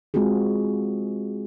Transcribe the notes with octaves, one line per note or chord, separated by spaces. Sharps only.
G#3 C4 F4 F#4 G#4